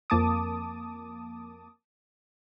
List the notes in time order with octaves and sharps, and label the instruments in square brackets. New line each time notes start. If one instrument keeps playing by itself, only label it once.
[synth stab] F2 A#3 A5 D6 D#6